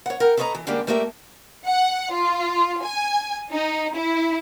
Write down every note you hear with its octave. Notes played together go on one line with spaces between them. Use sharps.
C#5 F#5
A#4 F#5 G5
A4 B4 C#5 D#5 F5 A#5
E3
D3 G3 G#3 A#3 D4 G4
G3 A3 A#3 G4 D5 E5
F#5
F4
G#5
D#4
E4